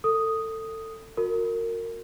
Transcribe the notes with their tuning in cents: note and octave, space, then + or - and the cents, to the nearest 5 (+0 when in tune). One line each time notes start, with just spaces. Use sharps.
A4 +25 D#6 +0
F#4 -30 A#4 -25